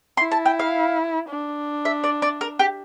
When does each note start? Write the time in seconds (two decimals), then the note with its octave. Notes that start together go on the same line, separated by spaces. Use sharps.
0.17 E4 C6
0.32 A5
0.46 G5
0.59 F5
1.29 D4
1.85 E5
2.04 D5
2.22 D5
2.41 A#4
2.59 G4